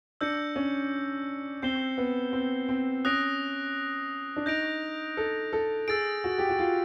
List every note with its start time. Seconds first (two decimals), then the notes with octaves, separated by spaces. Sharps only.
0.21 D4 E6 G6 A#6 C#7
0.56 C#4
1.62 C4 G6 C7 E7 G7
1.98 B3
2.33 C4
2.69 C4
3.05 C#4 D#6 F#6 A#6 D7
4.36 D4
4.46 D#4 G6 A#6 D7 F7
5.17 A4
5.53 A4
5.88 G#4 E6 A6 D7
6.24 F#4
6.38 G4
6.49 F#4
6.59 F4